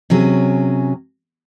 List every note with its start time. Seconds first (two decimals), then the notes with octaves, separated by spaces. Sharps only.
0.10 C3 F#3 C#4 G#4